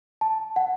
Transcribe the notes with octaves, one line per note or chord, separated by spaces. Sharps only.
A5
F#5